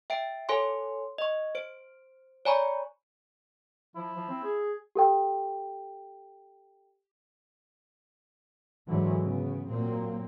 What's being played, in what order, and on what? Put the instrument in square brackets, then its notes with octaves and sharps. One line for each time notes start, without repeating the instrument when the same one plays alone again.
[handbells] E5 G5 D7
A4 C#5 G#5 C6
D#5 C#6
C5 D7
C#5 D5 G#5 A#5 B5 C#6
[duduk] F3 [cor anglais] E4
[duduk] F3
C4
G#4
[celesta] G4 A4 G5
[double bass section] G#2 D3 E3 F#3
C#3 B3
A#2 F#3 A#3 C4